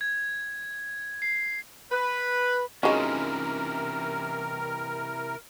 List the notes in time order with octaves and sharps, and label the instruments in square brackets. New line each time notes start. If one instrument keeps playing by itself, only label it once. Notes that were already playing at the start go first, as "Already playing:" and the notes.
[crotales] G#6
C7
[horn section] B4
[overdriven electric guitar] C3 E3 [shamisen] F#3 G#3 [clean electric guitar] C#4 D#4 F4 [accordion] A#4